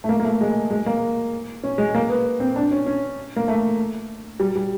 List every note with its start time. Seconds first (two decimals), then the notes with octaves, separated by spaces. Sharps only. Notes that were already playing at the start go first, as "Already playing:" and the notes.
0.04 A3
0.09 A#3
0.20 A#3
0.24 A3
0.41 G#3
0.71 G#3
0.86 A#3
1.63 C#4
1.78 G#3
1.95 A#3
2.09 B3
2.40 C4
2.56 D4
2.71 C#4
2.86 C#4
3.36 A#3
3.48 A3
4.40 G3
4.56 G3